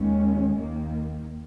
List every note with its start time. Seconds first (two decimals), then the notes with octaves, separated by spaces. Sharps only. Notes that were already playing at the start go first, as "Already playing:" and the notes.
Already playing: D#2 D#3 G#3 C#4
0.54 D#2 D#3 A#3